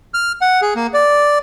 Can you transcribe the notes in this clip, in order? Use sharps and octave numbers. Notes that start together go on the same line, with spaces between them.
F6
F#5
G#4
A#3
D5